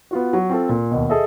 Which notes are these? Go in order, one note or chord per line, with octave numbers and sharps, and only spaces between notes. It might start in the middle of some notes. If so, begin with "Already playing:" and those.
B3 F4 F#4
F#3
C4 F4 A4
A#2
D#2 B2
G#4 A4 D#5 E5